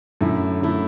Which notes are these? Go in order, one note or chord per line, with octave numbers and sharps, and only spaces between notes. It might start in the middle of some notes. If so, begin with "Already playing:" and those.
F#2 D3 A3 E4
F#2 D3 A3 E4